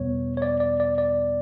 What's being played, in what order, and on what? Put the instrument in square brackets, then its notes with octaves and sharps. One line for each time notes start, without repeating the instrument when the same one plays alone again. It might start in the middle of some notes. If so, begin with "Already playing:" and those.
Already playing: [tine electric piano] E2 B2 G3 B3 C#5
C#5
D5
D5
D5
D5